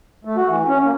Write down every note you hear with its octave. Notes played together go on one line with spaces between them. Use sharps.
A3
F#4
E3
C#4
A#3